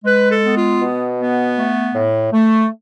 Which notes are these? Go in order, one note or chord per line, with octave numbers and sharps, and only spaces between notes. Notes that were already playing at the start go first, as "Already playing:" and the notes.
G#3 B4
A4
B3
F4
B2
B3
A3
A2
A3